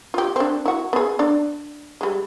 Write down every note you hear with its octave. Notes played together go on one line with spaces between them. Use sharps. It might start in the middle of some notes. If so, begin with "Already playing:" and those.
F4 G4
C4 D4
E4 F#4
B3 G#4
D4 D5
G3 G#3